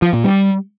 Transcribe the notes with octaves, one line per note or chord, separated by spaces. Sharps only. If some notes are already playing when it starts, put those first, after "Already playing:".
F3
A#2
G3